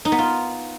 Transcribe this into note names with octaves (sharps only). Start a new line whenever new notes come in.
D#4
B3
F4